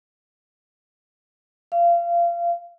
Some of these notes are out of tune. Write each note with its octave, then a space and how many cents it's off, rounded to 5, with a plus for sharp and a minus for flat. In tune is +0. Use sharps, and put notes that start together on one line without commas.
F5 -25